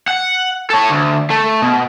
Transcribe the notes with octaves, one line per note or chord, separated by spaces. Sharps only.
F#5
A4 C#5
D2
A3
B2